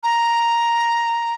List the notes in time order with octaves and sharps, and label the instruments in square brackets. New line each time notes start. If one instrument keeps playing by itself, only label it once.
[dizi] A#5